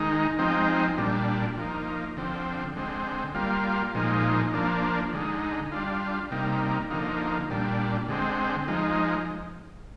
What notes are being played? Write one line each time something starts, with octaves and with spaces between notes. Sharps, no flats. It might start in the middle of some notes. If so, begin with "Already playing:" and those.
Already playing: D#3 G#3 D#4
F3 G#3 C4 D#4
A#2 G3 D4
F3 A#3 D#4
D3 F3 C4
D3 G#3 C4
G3 A#3 F4
A#2 F3 G#3 D#4
F3 A#3 D4
D3 G#3 D#4
G3 D4 F4
C3 G3 A#3 D#4
D3 F3 A#3 D#4
A#2 G3 D4
D3 G#3 C4
F3 G#3 D#4